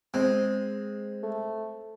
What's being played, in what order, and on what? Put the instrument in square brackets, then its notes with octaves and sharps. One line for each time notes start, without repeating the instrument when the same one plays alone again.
[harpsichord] G#3 [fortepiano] C4
[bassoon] A3